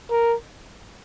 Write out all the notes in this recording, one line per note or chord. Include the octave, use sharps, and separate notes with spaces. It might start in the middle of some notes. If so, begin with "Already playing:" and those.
A#4